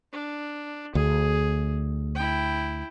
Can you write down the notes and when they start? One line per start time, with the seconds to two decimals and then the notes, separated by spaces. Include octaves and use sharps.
0.12 D4
0.95 D2 G#4
2.15 E4 G5